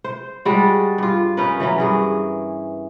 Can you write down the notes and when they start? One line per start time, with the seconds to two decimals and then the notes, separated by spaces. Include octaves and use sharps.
0.04 C5
0.45 G3 G#3 D4 F#4
0.98 G2 F4
1.37 C#4 D#4 A#4 B4
1.60 E3 F#3 C#4
1.78 G2 G#4 A#4